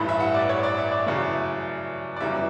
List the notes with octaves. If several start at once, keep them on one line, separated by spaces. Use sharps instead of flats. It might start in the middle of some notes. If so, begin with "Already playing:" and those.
Already playing: A1 G2 E3 A3 B5
E5
F#5
D5
C#5
D5
E5
D5
F#2 C#3 E3 A3
D5
G1 F#2 C#3 E3 G3 E5